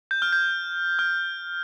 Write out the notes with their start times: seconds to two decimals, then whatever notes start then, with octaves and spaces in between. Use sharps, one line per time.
0.11 G6
0.22 F6
0.33 G6
0.99 F6